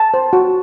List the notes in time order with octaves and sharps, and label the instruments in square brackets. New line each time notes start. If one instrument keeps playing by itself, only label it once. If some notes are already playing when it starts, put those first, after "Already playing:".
Already playing: [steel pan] A5
C5
F#4